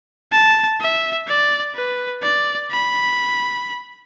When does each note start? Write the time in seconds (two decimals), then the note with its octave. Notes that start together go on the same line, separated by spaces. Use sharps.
0.32 A5
0.80 E5
1.28 D5
1.75 B4
2.23 D5
2.71 B5